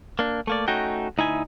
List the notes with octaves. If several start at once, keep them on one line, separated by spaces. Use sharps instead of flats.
A#3 D4
A3 A#3 D5
A3 C#4 D#4 F#4 G5
D2 D#4 E4 G#5